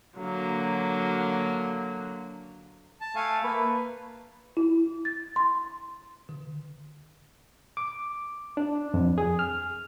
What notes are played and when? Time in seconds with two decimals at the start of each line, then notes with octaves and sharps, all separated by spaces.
0.18 D3 F#3 A#3
3.01 A5
3.16 A3 F5 G#5
3.44 A#3 B4
4.57 E4
5.05 A6
5.36 C6
6.29 D3
7.77 D6
8.57 D4
8.94 F2
9.18 G#4
9.39 F6